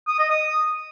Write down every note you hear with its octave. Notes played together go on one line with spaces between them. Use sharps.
D#6
D#5
D#6